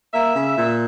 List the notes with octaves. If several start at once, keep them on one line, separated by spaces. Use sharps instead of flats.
A#3 E5
C#3
A#2